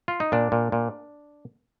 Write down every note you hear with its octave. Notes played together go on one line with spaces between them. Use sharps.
F4
D#4
A#2 D4
A#2
A#2